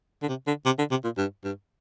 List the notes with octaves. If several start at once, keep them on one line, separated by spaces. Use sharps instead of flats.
D3
C3
D3
C3
D3
C3
A#2
G2
G2